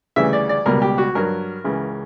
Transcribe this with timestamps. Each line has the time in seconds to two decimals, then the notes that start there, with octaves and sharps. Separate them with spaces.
0.16 D2 C#3 E3 G3 E5
0.33 D5
0.49 D5
0.66 C#2 B2 G3 A#4
0.82 G4
0.98 F#4
1.15 G2 F#3 A#4
1.64 C#2 C#3 E3